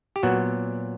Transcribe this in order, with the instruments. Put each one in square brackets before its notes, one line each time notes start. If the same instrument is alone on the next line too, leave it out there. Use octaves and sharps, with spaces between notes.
[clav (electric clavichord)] G4
A#2 F#3 B3 F#4